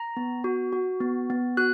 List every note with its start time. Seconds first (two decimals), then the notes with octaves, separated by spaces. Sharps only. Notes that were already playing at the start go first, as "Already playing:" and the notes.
Already playing: A#5
0.17 B3
0.44 F#4
0.73 F#4
1.01 B3
1.30 B3
1.57 F#4 F#6